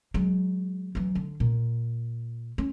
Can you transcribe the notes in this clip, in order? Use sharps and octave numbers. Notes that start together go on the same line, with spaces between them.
F#3 G#3
E3 F#3
D3
A#2
C#4